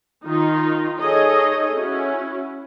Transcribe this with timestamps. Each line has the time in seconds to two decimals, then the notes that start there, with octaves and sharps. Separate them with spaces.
0.25 D#3 D#4 F4
1.01 D#4 G#4 A4 C#5 D#5
1.75 C#4 E4 F#4